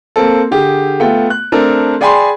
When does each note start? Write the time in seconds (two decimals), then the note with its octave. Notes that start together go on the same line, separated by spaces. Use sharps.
0.16 A#3 C4 A4
0.51 D3 G4 G#4
1.00 A3 B3 F4 G5
1.30 F#6
1.52 A3 C4 D4 A4 A#4
2.01 G#4 D5 G5 G#5 B5 C6